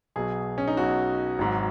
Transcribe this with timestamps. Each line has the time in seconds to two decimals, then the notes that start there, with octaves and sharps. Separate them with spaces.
0.16 B1 B2 F#3 G#4
0.58 C#4
0.68 D#4
0.77 B1 B2 F#3 F#4
1.39 G#1 G#2 F#3